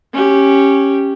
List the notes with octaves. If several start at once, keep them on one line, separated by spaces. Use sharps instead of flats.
C#4 G4